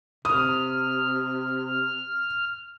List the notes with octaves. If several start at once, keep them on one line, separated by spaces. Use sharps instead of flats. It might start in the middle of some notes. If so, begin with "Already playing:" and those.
C3 D#6 F6